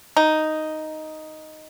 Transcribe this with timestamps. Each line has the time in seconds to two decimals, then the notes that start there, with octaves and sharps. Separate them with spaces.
0.17 D#4